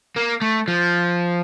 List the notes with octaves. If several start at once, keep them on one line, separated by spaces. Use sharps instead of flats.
A#3
A3
F3